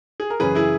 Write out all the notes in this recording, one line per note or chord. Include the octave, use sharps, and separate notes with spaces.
G#4
A#4
F#2 C#3 E3 G#4 B4
E4 G#4